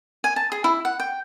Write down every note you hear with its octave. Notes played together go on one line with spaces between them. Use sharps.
G#5
A5
G#4
E4
F#5
G5